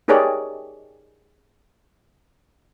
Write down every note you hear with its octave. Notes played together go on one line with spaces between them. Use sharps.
D#4 G4 G#4 A#4 C#5 D5